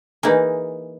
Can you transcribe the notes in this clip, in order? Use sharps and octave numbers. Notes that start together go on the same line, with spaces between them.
E3 A#3 D#4 G#4